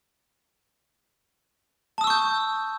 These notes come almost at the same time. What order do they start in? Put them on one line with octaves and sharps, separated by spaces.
A5 D#6 E6 C#6 G6